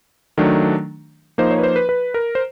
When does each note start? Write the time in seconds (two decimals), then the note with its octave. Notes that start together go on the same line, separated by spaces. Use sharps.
0.38 D#3 F#3 A3 D4
1.38 F3 A#3 D#4 C5
1.51 C#5
1.58 B4
1.63 C5
1.76 B4
1.89 B4
2.14 A#4
2.35 C5